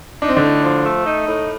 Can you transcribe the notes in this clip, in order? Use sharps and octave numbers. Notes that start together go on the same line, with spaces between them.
D4 D#4
C4
D3 D4
A2
F3
A3
D#4
A2